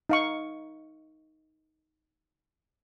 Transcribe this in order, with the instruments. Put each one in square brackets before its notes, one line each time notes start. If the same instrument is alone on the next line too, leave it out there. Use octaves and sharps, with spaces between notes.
[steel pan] D#4 F5 C#6